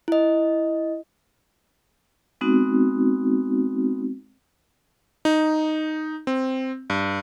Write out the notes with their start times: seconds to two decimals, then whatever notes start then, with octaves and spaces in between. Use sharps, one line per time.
0.08 E4 D#5
2.41 G#3 B3 C4 D#4 F#4
5.25 D#4
6.27 C4
6.90 G2